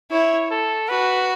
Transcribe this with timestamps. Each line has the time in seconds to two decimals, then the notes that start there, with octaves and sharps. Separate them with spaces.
0.11 E4 C#5
0.51 A4
0.89 F#4 B4